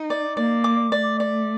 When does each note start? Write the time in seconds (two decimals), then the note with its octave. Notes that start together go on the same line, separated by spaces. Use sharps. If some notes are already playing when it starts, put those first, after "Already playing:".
Already playing: D#4
0.10 D5
0.37 A#3 D5
0.64 D6
0.92 A3 D5
1.20 D5